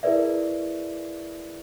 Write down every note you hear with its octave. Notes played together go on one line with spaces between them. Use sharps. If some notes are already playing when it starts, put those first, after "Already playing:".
E4 G#4 A#4 B4 D5 E5